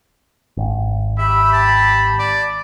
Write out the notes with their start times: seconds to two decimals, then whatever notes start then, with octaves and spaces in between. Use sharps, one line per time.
0.57 G#1
1.18 G4 E5 B5
1.53 A5
2.19 D5